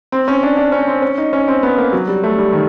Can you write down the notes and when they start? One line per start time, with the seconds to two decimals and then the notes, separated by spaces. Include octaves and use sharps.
0.12 C4
0.28 C#4
0.43 D4
0.57 D4
0.72 C#4
0.88 C4
1.02 C#4
1.18 D#4
1.33 C#4
1.48 C4
1.63 B3
1.78 A#3
1.93 F#3
2.08 G3
2.23 A3
2.38 G3
2.53 D#3